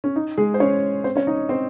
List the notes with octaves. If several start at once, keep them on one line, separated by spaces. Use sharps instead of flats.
C#4
D#4
G#3 G#4
C5
C#4 C#5
C4 C5
C#4 C#5
D#4 D#5
C4 C5